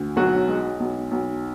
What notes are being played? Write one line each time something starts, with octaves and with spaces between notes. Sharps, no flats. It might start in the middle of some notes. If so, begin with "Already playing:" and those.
Already playing: D2
B1 F#3 F#4
G#3
B1
B1